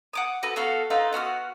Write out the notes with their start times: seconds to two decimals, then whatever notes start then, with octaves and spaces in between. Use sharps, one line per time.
0.13 F#5 D6 D#6
0.43 F#4 A4 B4
0.56 B3 F#4 A4 F5
0.90 D#4 F4 A4 B4
1.13 B3 F#4 F#5 F6